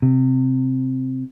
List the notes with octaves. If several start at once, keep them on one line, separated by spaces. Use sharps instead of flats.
C3